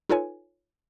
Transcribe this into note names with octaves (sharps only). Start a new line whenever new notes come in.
D#4 F4 A4 B4 C#5 G#5